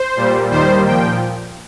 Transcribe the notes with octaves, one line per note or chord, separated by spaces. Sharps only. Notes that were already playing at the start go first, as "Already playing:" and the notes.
Already playing: C5
A#2 G3
D#2 D#3 G3 C5
A#2 F3 G5